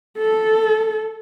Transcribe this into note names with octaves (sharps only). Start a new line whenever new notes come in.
A4